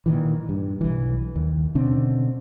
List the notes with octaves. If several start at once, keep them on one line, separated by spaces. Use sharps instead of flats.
A#2 D#3 E3
G2
B1 E3
D#2
B2 D3 C4 C#4